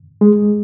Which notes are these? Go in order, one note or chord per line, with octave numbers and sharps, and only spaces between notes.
G#3